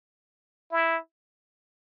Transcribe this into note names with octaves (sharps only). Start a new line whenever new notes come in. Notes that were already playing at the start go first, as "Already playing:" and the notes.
E4